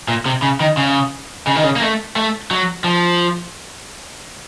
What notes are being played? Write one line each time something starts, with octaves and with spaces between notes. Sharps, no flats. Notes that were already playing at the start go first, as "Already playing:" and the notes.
A#2
C3
C#3
D#3
C#3
C#3
D#3
C#3
A#3
A3
A3
F#3
F3